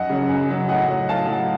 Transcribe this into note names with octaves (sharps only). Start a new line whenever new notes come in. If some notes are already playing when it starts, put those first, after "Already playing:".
Already playing: F#2 D#5 F#5
C#3 F#3
F#2
C#3 F#3
A2 D#5 F#5
F#3
A2 F5 A5
F#3